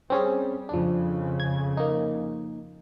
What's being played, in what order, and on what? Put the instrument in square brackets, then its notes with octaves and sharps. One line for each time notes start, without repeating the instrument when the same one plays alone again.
[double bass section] G3 [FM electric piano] C4 C#4 G#4
[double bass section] F2 C#3 [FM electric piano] F3 D4
[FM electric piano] G#6
A#3 D#4